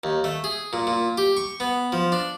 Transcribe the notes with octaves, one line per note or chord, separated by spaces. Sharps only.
D#2
A3
G#4
A#2
A#2
G4
C#6
B3
F3
D4